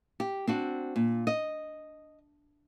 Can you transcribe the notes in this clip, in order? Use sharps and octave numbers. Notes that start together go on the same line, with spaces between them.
G4
C4 D4 F#4
A#2
D#5